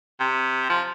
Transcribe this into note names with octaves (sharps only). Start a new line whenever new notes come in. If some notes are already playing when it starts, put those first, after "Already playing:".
C3
F3